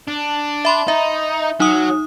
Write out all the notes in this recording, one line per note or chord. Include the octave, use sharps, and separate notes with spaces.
D4
E5 B5 C6
D#4 E5
F#3 D#4 D#6